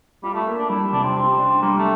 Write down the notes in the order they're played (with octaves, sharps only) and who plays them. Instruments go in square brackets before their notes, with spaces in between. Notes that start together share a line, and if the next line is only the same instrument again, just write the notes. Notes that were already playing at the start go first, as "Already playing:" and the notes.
[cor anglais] G3 [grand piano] F4
[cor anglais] A3
[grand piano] A#3
[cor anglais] D4
[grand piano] G3 [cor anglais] E4
[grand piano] C3 [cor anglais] D4
[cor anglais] C4
[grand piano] G4
D4
[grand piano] G3 [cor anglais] A#3
[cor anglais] A3